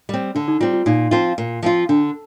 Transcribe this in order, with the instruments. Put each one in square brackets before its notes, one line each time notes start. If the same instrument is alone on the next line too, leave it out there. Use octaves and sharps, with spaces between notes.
[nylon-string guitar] G3 C4
[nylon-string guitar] D3 [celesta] D4
[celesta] D#4
[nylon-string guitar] G3 C4 [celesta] F4
[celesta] F4
[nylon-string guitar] A#2 [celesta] D#4
[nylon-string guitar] F3 C4 F4
A#2
F3 C4 F4
[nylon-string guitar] D3 [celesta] D4